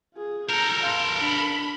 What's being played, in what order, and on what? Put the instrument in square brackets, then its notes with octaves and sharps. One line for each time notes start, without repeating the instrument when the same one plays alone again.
[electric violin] F4 G#4
[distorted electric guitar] A4 A#4 [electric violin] A#5 G6
[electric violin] F5 C6
D4 B5